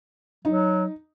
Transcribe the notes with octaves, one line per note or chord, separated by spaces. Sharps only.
F#3 D#4